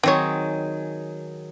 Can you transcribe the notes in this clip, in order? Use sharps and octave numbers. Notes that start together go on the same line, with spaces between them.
D#3 F#3 C4 G#4 C#5